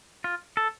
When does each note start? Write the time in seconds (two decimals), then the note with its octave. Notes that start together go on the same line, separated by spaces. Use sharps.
0.24 F4
0.57 A4